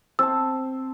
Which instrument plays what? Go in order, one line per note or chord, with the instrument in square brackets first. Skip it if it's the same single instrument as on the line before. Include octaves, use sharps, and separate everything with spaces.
[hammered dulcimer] C4 A5 [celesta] E6